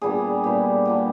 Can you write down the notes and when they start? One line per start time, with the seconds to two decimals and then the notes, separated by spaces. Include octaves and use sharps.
0.02 A#2 G3 B3 D4 G#4
0.44 A#2 G3 B3 D4 G4
0.85 A#2 G3 B3 D4